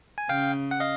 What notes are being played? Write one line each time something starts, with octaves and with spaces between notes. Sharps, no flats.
G#5
C#3 F5 G5
F#5
D#5 F5